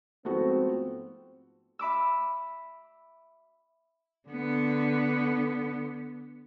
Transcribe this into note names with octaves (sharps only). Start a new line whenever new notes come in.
G#2 F3 A3 B3 C4 F#4
E5 B5 D6 E6
D3 B3